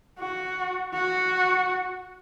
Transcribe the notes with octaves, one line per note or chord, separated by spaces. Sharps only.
F#4
F#4